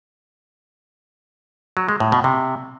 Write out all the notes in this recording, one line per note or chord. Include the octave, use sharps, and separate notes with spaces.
F#3
G#3
A2
B2
C3